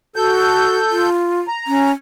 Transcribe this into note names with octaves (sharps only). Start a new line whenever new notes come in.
F#4 A4 G6
F4
A#5
C#4